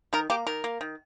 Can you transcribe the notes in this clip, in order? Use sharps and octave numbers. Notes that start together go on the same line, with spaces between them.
D#3 A#4
A#3 G4
D#3 A#4
A#3
D#3